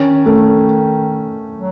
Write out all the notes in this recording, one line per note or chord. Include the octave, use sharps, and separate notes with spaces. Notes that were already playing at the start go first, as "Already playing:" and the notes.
Already playing: D#3 C#4
A3
F#3